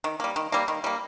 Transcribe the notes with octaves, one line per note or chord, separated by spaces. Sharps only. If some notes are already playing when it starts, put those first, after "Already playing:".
D#3
G3 A#3
D#3
G3 A#3
D#3
G3 A#3